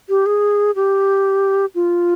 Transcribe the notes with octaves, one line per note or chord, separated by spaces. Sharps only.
G4
G#4
G4
F4